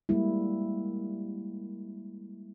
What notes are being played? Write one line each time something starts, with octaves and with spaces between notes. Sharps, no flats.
G3 G#3 A#3 E4